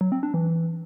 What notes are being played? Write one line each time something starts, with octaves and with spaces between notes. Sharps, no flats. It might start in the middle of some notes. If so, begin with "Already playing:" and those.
F#3
C4
D4
E3